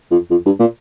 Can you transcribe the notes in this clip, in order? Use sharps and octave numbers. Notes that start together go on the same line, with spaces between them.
F2
F2
G2
A#2